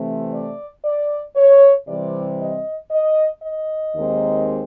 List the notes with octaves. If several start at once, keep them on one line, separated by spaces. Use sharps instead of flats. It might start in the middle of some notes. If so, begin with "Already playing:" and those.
Already playing: C3 E3 A3 C4
D5
D5
C#5
C3 E3 G3 C4 D5
D#5
D#5
D#5
D#2 D#3 G#3 C4